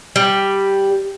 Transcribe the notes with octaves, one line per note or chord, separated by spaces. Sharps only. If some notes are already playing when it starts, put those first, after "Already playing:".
G3